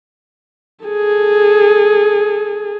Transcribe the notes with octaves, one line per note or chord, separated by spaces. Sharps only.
G#4 A4